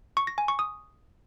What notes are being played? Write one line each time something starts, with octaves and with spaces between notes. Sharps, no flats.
C#6
A#6
G#5
C#6
D#6